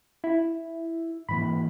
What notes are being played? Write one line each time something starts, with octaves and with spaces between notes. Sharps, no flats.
E4
G#2 E3 A#3 B5